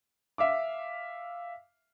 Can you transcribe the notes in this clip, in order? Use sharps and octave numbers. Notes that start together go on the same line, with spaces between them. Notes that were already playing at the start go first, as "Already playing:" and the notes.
E5 F5 D6